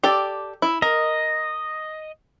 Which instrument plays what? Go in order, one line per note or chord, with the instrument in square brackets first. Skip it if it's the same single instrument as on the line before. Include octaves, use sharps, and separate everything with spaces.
[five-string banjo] G4 A4 D5
E4
[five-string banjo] A#4 [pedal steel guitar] D#5